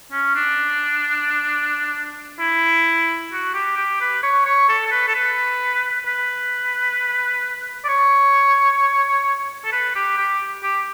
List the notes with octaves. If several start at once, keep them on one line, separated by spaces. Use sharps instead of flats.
C#4
D4
E4
F#4
G4
G4
B4
C#5
C#5
A4
A4
B4
A4
B4
B4
D5
C#5
A4
B4
G4
G4
G4